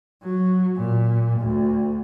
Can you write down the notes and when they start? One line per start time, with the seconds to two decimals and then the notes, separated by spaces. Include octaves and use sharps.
0.23 F#3
0.77 A#2
1.40 D2